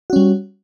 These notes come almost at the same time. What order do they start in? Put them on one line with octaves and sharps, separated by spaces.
F#4 C#4 G3